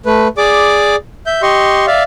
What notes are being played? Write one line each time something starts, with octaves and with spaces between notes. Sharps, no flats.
A3 B4
G#4 D5 D6
E5 G6
G4 D#5 C6 C#6
D5 E5 F5